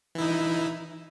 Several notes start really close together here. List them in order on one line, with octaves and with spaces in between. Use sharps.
E3 E4 D#4